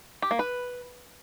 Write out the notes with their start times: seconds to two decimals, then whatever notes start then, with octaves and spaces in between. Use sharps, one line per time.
0.22 G4
0.31 A#3
0.39 B4